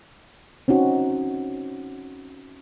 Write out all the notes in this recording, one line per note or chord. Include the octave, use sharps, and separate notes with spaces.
C4 C#4 D#4 F#4